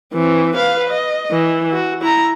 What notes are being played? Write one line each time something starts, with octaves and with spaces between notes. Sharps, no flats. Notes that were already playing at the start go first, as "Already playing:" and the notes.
E3 C4
B4 F5
D#5
E3
F#4
E4 A#5